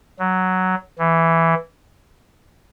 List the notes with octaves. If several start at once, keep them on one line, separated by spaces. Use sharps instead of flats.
F#3
E3